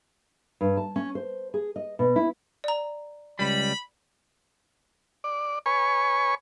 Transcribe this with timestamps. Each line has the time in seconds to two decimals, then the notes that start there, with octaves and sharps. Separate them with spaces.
0.61 G2
0.77 A5
0.96 C#4
1.15 C5
1.54 G#4
1.76 D#5
1.99 B2
2.16 E4
2.64 D5 A#5
3.39 C#2 G3 B5
5.24 D5
5.66 B4 C#5 G#5 C#6